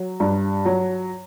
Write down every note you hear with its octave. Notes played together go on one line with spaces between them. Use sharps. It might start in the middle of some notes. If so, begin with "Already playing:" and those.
Already playing: F#3
G2
F#3